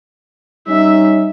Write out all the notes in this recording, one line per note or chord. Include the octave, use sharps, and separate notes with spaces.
G3 C#4 D#4 E5